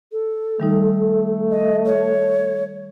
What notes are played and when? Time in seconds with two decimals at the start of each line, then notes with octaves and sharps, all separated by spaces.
0.12 A4
0.60 D#3 G3 A3 D#4
1.50 D#5
1.86 C#5